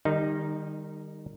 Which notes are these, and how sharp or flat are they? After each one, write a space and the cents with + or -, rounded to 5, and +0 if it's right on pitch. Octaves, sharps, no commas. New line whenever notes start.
D#3 -25 G3 +20 D#4 +0